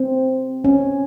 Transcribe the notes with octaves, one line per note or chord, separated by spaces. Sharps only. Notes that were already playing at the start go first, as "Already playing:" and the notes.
Already playing: C4
C#4